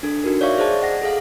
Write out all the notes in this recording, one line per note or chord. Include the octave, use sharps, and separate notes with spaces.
D4 A4
D#4 F#4 A#4
C#5 D5 E5 F5 C#6
G#4 C5 D5 A5
D#5 F#5 A#6
G#4 A4 F5